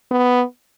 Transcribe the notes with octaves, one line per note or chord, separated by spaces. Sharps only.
B3